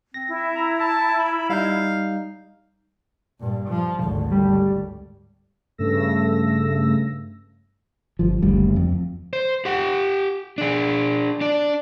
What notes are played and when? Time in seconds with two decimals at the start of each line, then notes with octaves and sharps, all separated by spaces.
0.14 C4 A#6
0.29 E4
0.55 A#5
0.80 A5 A#5
1.19 B5
1.50 G3 D#4 F5 G6
3.39 G2 A#2
3.69 F3
4.02 G#1 D2
4.31 G3
5.78 G2 C#3 A3 E6 A#6
8.19 G1 F3
8.42 F#1 D2 G3
8.76 F2
9.33 C5
9.65 G4 F#5
10.58 D4 G#4
11.41 D4 D5